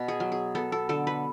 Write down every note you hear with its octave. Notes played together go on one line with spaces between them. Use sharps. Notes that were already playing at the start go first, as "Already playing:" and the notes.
Already playing: B2
G#4
F#3
G#4
B3 A4
A4
D3 A4
B4